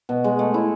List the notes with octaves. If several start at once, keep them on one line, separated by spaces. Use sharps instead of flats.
B2
G#3
A3
E4